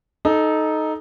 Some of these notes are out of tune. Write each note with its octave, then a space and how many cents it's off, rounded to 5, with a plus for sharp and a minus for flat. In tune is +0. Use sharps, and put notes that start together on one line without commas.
D#4 +0 A4 -20